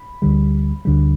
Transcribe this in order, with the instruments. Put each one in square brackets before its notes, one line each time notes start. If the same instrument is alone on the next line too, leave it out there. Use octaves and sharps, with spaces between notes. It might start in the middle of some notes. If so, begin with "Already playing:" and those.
Already playing: [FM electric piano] B5
D2 D3 G3
D2 D3 G3